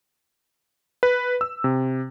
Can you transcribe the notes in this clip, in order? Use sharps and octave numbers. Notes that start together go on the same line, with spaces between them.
B4
E6
C3